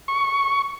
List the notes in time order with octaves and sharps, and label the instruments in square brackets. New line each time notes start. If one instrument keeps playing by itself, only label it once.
[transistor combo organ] C#6